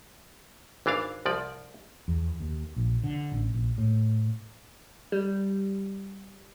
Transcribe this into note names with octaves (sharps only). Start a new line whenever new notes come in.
G#1 E3 D4 F5
C2 F3 D5
E2
D#2
A#1
D3
A1
A#1
A2
G3